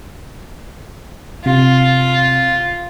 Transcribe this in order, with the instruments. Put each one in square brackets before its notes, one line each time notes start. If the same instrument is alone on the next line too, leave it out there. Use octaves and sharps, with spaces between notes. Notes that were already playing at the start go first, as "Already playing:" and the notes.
[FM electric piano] C3 [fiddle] F4